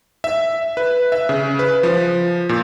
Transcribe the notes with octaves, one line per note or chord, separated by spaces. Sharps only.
E5
B4
E5
C#3
B4
F3
A#2